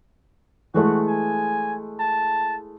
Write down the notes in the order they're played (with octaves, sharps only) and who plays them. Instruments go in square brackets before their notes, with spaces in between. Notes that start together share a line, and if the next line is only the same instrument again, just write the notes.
[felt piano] E3 G#3 A3 [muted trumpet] F#4
[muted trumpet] G#5
A5